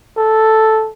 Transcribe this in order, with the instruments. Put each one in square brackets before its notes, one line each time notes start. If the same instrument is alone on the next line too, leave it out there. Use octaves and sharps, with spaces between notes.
[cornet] A4